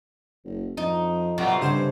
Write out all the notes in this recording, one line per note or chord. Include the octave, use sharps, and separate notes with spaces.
F#1
F2 D#4
C3 F#3 G3 B3 F4 A4
G2 C#3 C#4 C5